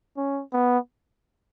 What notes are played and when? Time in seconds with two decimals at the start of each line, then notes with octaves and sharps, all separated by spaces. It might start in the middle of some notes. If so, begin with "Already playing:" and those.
0.17 C#4
0.53 B3